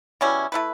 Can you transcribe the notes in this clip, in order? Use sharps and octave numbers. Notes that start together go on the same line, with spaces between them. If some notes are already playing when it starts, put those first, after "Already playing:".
B2 G3 C#4 E4
A3 E4 B4